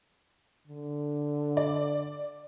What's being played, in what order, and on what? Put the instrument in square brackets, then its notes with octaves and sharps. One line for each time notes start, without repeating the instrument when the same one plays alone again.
[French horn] D3
[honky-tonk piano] D5